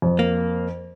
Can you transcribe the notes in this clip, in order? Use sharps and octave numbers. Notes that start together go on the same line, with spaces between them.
F2
A#3